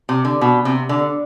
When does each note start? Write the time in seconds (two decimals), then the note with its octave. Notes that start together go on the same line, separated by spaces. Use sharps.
0.09 C3
0.25 D3
0.41 B2
0.65 C3
0.89 D3